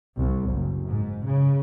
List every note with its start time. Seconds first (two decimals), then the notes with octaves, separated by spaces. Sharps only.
0.17 C2
0.49 F#1
0.87 G#2
1.25 C#3